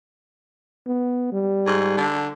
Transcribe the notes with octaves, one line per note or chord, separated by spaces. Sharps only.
B3
G3
G#2
D3